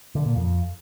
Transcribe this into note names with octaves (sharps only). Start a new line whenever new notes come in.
D3
A#2
F2